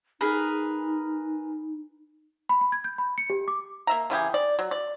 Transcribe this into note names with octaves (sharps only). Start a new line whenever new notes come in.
D#4 G#4 A#4 B4
B5
B5
G#6
G6
B5
C#7
G4
D6
A#3 E5 A#5
C#3 E3 G4 G#4
D5
F#3
D5